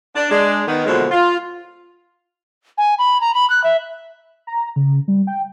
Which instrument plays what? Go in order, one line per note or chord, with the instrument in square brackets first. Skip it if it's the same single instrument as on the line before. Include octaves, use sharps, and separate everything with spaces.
[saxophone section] D4
G#3 D4
D#3 B3
B2 D3 F3 F#3 G#3 A#3
F4
[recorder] G#5
B5
A#5
B5
F#6
E5
[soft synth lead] A#5
C#3
G3
G5